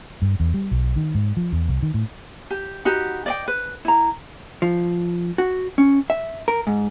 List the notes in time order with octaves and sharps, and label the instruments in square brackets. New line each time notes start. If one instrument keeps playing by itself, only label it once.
[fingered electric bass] G2
E2
G3
B1
D#3
G#2
F3
E2
C2
D#3
A2
[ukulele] G4
D#4 F#4 G4 B4
D5 D#5 G5
B4
E4 A#5
[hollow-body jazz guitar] F3
F#4
C#4
E5
A#4
G#2